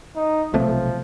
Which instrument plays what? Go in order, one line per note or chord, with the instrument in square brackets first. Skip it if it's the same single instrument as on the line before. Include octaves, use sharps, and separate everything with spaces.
[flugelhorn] D#4
[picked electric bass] B1 C3 A3 [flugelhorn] F3